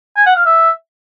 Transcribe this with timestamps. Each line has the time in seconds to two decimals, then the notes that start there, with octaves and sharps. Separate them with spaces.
0.17 G#5
0.26 F#5
0.36 F5
0.46 E5